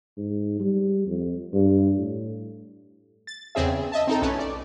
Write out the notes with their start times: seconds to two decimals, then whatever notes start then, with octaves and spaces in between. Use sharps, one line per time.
0.17 G#2
0.60 G3
1.07 F2
1.53 G2
1.98 A2
3.27 A6
3.55 E2 C#3 C4 G#4 E5
3.92 D#5 E5 A5
4.07 C4 D#4 A4
4.22 B1 E3 A3 C#4 A5
4.39 D5